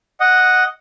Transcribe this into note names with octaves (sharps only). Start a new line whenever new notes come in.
D#5 F#5